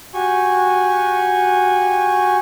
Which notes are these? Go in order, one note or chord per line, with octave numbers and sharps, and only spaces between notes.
F#4 G4 G#5 C#6